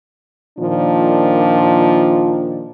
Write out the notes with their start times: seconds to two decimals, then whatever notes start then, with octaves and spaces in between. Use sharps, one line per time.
0.59 A#2 D#3 F3 D4